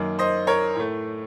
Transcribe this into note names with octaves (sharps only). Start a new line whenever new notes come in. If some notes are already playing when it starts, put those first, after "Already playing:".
Already playing: F#2 D#3 A#3
C5 D#5
A#4 C#5
A2 A3